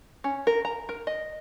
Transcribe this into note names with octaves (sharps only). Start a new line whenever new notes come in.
C#4
A#4
A#5
A#4
D#5